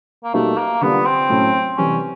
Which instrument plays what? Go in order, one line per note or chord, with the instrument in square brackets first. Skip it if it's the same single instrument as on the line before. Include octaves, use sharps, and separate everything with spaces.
[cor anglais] A#3
[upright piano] B2 G3 A#3 D#4 [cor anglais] A3
[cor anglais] A#3
[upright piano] D3 G3 A#3 D4 F4 [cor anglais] B3
[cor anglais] C4
[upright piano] A2 F#3 A3 C#4
[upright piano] C3 E3 G3 [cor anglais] C#4